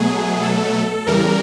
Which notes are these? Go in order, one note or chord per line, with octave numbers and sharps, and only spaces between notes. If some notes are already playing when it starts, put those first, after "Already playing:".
Already playing: B2 F#3 A3 G#4
A4
E2 C#3 E3 G3 A#4